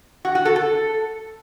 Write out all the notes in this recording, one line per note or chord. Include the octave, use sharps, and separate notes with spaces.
F#4
F#4
A4
A4